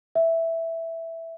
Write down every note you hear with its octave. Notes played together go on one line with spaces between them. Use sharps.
E5